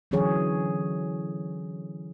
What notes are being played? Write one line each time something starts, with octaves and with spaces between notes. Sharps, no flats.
D3 E3 F#3 C#4 G#4 C#5